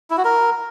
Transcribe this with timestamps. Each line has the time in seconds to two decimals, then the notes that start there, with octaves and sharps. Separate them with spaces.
0.10 E4
0.18 F#4
0.25 A#4